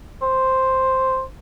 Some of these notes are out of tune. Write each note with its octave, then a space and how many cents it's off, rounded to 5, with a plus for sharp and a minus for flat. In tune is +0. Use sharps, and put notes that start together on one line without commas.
C5 +0